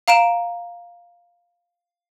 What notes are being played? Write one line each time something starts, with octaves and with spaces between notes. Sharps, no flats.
F5 A#5 D7 E7